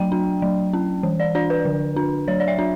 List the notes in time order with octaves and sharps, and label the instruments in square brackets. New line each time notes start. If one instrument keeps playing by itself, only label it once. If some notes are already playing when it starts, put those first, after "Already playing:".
Already playing: [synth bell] F#3 D4 G5
D4
F#3
C#4
E3
D5
D4 D5
B4
D3
D4
F#3 C#5
D5
E5
D4